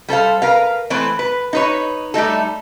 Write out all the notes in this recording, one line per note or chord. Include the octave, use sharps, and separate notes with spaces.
G3 A4 C5 F5
A#4 B4 F5
E3 A3 C4 B4 C5
B4
D#4 B4 C#5
G3 A3 D#4 A4